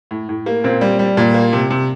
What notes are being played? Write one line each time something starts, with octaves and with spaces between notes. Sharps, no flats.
A2
A2
A#3
A#2 C4
G3
G3
A#2
A#3
C3
C3